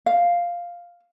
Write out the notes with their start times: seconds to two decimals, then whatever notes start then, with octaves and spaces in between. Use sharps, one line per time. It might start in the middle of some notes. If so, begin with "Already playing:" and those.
0.06 F5